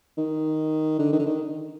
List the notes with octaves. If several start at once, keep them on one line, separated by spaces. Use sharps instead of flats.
D#3
D3
D#3
D3
D#3